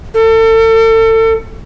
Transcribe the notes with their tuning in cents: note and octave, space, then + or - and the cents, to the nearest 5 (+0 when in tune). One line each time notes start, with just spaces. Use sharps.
A4 +35